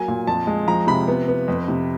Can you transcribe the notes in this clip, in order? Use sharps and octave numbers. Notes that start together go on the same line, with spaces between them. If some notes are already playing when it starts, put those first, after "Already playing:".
Already playing: F#3 A#3 G#5
A#2
F2 A5
G#3
F3 A#5
C3 B5
B3
B3
F2
C3